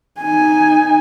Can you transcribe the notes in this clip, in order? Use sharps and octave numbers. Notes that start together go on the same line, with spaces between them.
D#4 G#5